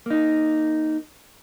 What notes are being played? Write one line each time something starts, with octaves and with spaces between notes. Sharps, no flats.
A#3 D#4